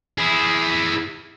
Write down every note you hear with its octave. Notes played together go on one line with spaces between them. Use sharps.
E4 G#4